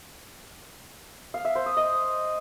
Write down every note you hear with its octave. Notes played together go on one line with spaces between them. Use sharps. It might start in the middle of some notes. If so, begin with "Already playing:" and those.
F5
E5
C5
D#6
D#5